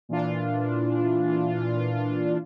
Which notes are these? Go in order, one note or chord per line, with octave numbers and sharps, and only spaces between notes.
A#2 E3 D4 F4